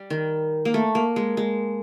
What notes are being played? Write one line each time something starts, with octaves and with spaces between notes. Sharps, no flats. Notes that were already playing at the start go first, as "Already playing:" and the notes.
Already playing: G3
D#3
A#3
A3
A#3
G#3
G#3